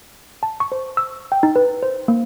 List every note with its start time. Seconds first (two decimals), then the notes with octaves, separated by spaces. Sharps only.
0.43 A5
0.60 C#6
0.72 C5
0.97 E6
1.32 G5
1.43 D#4
1.56 B4
1.83 C5
2.08 A#3